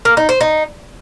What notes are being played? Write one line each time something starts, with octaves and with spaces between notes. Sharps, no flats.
A#3
D#4
C5
D#4